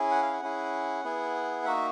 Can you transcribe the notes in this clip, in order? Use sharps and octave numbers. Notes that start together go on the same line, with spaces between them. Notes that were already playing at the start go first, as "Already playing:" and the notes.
Already playing: C#4 E4 G#4
F#5
F5
F#5
C#4 E4 G#4
B3 E4 G#4
A#3 D#4 F#4 E5